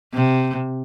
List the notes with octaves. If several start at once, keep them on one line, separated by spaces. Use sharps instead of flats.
C3